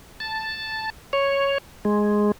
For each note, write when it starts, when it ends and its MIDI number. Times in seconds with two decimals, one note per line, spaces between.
0.20 0.90 81
1.13 1.58 73
1.85 2.32 56